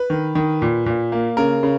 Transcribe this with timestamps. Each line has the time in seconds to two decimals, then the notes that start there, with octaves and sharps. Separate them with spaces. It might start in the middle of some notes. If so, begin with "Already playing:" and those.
Already playing: B4
0.10 D#3
0.35 D#3
0.62 A#2
0.86 A#2
1.12 A#3
1.37 C#3 A#4
1.63 C#3